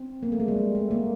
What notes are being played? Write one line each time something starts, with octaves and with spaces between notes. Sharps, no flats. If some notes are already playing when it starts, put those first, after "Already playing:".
Already playing: C4
A#3
A3
G#3
G3
G#3
A3
A#3